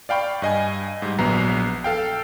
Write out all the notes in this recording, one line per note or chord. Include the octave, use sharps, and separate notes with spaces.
D5 F5 G5 B5 C#6
G2 D#5 G#5
G#2 G3
A#1 F#3 B3 B4 A#5 C7
A4 F5 G5